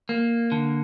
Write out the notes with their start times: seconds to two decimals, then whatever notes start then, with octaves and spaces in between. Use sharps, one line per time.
0.09 A#3
0.52 D3